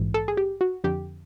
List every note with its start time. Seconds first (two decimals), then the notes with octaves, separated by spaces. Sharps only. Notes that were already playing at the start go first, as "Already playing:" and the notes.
Already playing: A#1 G#2 E3
0.14 A4
0.28 G#4
0.37 G4
0.61 F#4
0.84 F2 D3 G4